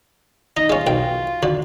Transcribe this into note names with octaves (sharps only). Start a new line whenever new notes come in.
D#4 D#5
G#3 C#4 F4
B1 G5
D2 D3